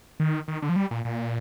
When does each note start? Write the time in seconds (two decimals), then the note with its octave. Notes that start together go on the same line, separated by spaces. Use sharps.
0.20 D#3
0.48 D#3
0.62 D3
0.69 F3
0.76 G3
0.91 A#2
1.05 A#2